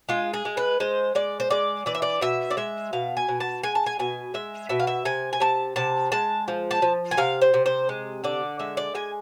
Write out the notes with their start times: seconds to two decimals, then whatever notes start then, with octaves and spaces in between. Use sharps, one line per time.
0.09 G#3 F4
0.34 G#4
0.45 G#3
0.57 B4
0.80 G#3 C5
1.15 G#3 D5
1.40 C5
1.50 G#3 D5
1.86 E3 D5
1.95 E5
2.02 D5
2.21 B2 E5
2.51 D5
2.57 G#3 E5
2.93 B2 F5
3.17 G#5
3.28 B2
3.40 A5
3.63 G#3 G#5
3.75 A5
3.86 G#5
3.99 B2 G#5
4.34 G#3 E5
4.69 B2 E5
4.80 F5
4.87 E5
5.05 C3 G#5
5.33 G#5
5.40 C3 A5
5.76 C3 A5
6.12 G#3 A5
6.48 F3
6.71 A5
6.82 F3
7.11 G#5
7.17 C3 F5
7.42 C5
7.54 C3
7.66 C5
7.89 G#3
8.24 D3 D5
8.59 G#3 E5
8.77 D5
8.95 G#3 G#5